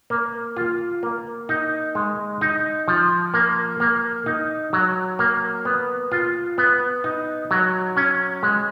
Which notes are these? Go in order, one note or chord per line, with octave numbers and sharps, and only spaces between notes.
A#3
F4
A#3
D#4
G#3
D#4
F3
A#3
A#3
D#4
F#3
A#3
B3
F4
B3
D#4
F#3
C#4
G#3